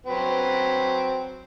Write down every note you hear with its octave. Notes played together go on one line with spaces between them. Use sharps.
F#3 C4 B4